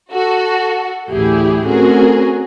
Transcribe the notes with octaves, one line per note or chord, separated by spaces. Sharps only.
F#4 A4
A1 D2 E4 G4 G#4
A3 C4 C#4 F#4 G#4 A#4